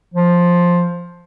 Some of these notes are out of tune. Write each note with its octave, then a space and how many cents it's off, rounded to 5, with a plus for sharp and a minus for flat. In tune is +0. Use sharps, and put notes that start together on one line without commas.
F3 +5